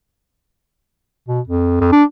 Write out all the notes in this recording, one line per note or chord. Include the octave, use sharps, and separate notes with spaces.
B2
F2
F2
D4